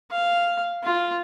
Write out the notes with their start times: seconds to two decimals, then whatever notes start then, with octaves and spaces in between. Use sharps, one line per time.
0.11 F5
0.83 F4